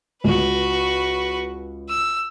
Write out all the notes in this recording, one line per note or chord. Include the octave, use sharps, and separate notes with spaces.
C#2 F#4 B4
E6